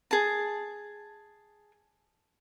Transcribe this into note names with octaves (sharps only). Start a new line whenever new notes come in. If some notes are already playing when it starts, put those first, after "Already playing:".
G#4 A5